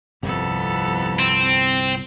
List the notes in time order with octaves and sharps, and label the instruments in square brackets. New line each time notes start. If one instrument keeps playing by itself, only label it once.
[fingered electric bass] G1 C2 [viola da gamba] F2 B3 A4
[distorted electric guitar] C4